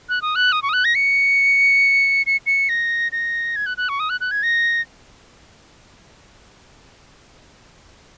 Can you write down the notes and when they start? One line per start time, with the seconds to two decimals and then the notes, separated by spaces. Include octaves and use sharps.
0.09 F#6
0.22 D#6
0.36 F#6
0.52 D#6
0.62 C#6
0.69 D#6
0.73 F#6
0.85 A#6
0.95 C#7
2.26 C#7
2.46 C#7
2.69 A#6
3.12 A#6
3.56 G#6
3.66 F#6
3.77 F#6
3.89 C#6
4.00 D#6
4.10 F#6
4.21 F#6
4.31 G#6
4.43 A#6